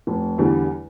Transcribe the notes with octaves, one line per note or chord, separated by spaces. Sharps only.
F1
E2 D3 G3